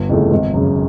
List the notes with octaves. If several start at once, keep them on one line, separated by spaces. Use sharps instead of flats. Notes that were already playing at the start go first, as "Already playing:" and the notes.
Already playing: G1
F2 C#3 E3 A3
G#1
F#2 C#3